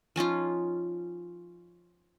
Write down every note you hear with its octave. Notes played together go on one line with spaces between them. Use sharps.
F3 C#4 D#4 F4